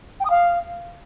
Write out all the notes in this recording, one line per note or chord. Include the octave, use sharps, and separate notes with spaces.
G5
D#6
F5